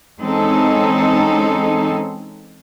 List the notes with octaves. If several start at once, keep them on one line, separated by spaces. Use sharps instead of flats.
E3 G#3 C4 C#4 D#4 A4